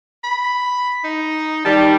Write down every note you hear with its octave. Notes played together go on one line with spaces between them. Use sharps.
B5
D#4
D#3 G3 A5